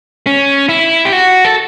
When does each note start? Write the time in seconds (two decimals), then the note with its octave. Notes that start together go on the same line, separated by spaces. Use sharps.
0.27 C#4
0.69 E4
1.05 G4
1.12 F#4
1.45 A4